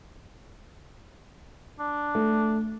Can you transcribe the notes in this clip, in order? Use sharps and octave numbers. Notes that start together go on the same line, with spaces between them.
D4
A3